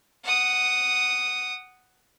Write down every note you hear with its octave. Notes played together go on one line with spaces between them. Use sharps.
F#5 D#6